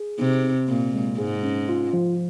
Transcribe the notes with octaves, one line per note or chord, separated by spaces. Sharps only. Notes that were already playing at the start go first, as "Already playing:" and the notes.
Already playing: G#4
C3 D#4
C4
A#2 C4
G#3
G#2 G#4
C#4
F4
F3